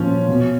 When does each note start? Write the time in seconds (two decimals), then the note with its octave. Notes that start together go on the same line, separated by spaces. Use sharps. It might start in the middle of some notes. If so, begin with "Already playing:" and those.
Already playing: A#2 F3 C#4
0.29 B2